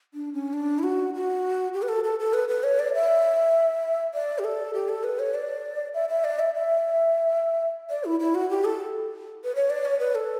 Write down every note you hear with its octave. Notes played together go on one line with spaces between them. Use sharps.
D4
C#4
D4
E4
F#4
F#4
G4
B4
A4
A4
A4
B4
B4
C#5
D5
E5
D5
G4
A4
G4
A4
B4
C#5
D5
E5
E5
D5
E5
E5
D5
E4
E4
F#4
G4
A4
B4
C#5
D5
C#5
B4
A4